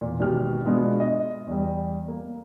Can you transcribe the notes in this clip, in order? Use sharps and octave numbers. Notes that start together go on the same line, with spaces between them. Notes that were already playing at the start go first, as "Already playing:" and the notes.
E2 A#2
G#1 B2 G4 F6
B2 G#3 B3 D4 F4
D#5
E2 G3
A#3